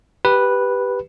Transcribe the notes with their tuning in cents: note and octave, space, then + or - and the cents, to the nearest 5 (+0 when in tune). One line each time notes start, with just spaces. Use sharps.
G4 +0 B4 -5